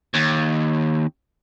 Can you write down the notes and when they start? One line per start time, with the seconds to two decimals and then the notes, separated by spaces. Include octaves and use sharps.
0.14 D#2